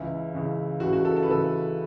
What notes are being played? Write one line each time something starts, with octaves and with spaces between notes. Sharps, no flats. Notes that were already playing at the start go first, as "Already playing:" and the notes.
Already playing: C#2 C#3 E3 E4
C#2 C#3 E3
C#2 C#3 E3 F#4
F#4
A4
A4
B4
C#2 C#3 E3 A4